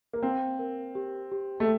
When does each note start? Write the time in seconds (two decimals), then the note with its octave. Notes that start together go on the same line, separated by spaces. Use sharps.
0.13 A#3
0.23 C4 F5
0.59 A#4
0.95 G4
1.32 G4
1.60 A3